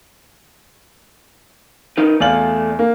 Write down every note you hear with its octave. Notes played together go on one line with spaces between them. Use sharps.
D#4 A#4 B4
E2 A3 D5 F5 F#7
A#3